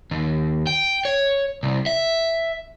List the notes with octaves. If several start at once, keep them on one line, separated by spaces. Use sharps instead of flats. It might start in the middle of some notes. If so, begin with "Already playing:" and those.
D#2
G5
C#5
C2
E5